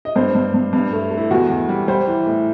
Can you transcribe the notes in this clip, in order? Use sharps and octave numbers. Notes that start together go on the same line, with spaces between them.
D#5
G2 C5
G2
G2
G2
A3
A3
E4
E2 F#4
E2
G3
G3 C5
E3
A2